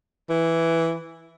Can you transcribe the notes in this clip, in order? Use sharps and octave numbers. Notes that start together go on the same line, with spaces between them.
E3